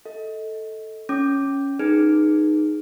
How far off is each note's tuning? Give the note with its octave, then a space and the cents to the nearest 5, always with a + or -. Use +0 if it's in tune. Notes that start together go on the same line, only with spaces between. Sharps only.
A4 +0 D#5 +25
C#4 +0 D6 +0
D#4 -15 G#4 +0 B4 -25